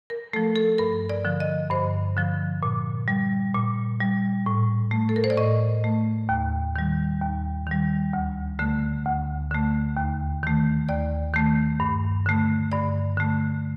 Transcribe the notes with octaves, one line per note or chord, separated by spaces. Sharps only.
A#4
F3 A3 A4
A4
G2 A#4
D5
D3 F3
D#5
G2 C5
D3 F3
A#2
G3
A#2
G3
A2
A3
A4
A#4
C5
D5
A2 D#5
A3
D#2
D#3 G3
D#2
D#3 G3
D2
D3 A3
D2
D3 A3
D#2
D#3 A3
D#2 D5
D#3 A3
G2
D3 A3
G2 D5
D3 A3